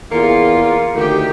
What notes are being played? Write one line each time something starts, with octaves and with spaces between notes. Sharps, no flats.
E2 A#3 F4 G#4 C#7
D2 D#3 G4